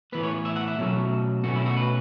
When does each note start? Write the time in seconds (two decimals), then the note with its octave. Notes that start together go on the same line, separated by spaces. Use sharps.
0.12 A2 E3 B3 B4
0.23 C#5
0.45 E5
0.56 F#5
0.68 E5
0.78 B2 F#3 A3 C#4
1.44 B2 A3 C#4 F#4
1.55 E4
1.66 F#4
1.77 B4